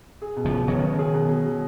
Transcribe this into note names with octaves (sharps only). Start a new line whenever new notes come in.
G#4
B2
C#3 F3
B2
D#3 F#3 C#4
C#4
G#4
B2
G#4
F#3